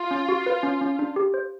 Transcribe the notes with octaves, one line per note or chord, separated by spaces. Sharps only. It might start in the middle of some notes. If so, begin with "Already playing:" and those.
Already playing: F4
C#4
F#4
B4
C#4
C#4
D4
G4
C5